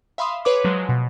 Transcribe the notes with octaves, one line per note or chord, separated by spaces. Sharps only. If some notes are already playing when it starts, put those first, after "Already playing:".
E5 F5 B5 C6 D#6
G#4 B4 C#5 D6
F3 F#3 G#3
B2